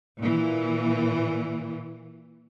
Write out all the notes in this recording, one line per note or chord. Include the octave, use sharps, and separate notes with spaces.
A#2 E3